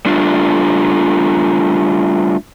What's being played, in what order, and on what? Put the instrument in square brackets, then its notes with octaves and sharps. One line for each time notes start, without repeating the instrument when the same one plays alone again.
[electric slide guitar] G3 A3 D4 F4